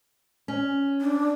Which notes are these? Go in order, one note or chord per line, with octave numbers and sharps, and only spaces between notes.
C#4
D4